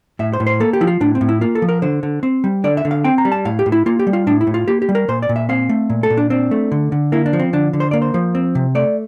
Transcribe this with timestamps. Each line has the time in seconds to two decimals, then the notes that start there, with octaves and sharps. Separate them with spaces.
0.19 A2 E5
0.33 C5
0.40 A2
0.47 C5
0.60 A#3 A4
0.73 G4
0.81 F3 E4
0.87 F4
1.01 A2 D4
1.15 C4
1.21 A2
1.29 E4
1.41 A#3 F4
1.55 A4
1.62 F3
1.69 A#4
1.82 D3 C5
2.03 D3
2.23 C4
2.44 G3
2.64 D3 D5
2.77 E5
2.85 D3
2.91 F5
3.04 C4 G5
3.18 A#5
3.25 G3
3.32 A5
3.45 A2 F5
3.59 G4
3.66 A2
3.72 E4
3.86 A#3 F4
3.99 G4
4.07 G3
4.13 F4
4.27 A2 D4
4.41 E4
4.47 A2
4.54 F4
4.68 A#3 G4
4.82 G4
4.89 G3
4.95 A#4
5.08 A#2 C5
5.22 D5
5.29 A#2
5.36 E5
5.49 C4 F5
5.69 A3
5.90 A#2
6.03 A4
6.10 A#2
6.17 D4
6.30 C4 D4
6.51 A3
6.72 D3
6.92 D3
7.12 A#3 E4
7.26 D4
7.33 F3
7.39 C4
7.53 D3 D4
7.73 D3
7.80 C5
7.91 A#3 D5
8.02 C5
8.14 F3
8.35 C4
8.55 C3
8.75 A3 D5